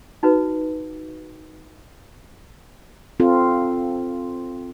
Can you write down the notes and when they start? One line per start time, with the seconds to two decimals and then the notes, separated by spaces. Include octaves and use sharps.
0.23 D#4 F#4 B4
3.20 C4 F4 A4